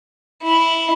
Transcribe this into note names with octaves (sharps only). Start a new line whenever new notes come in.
E4